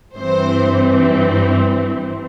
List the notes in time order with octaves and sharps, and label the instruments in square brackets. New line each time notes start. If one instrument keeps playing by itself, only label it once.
[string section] G2 E3 C4 C5